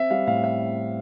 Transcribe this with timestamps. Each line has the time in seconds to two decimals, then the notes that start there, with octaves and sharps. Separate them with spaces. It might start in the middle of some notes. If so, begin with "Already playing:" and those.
Already playing: C4 E5
0.10 G3 F5
0.27 A2 F5
0.44 E5